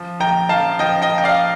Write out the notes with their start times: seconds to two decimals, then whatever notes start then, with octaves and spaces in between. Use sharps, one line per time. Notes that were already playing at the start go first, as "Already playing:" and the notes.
Already playing: F3
0.20 A#1 G5 A#5
0.49 A#1 F5 A5
0.79 F3 D#5 G5
1.02 D#5 G5
1.10 F3
1.18 G5
1.24 D5 F5